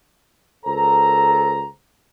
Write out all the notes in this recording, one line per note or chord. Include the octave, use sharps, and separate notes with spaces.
C#2 A4 A#4 C5 A#5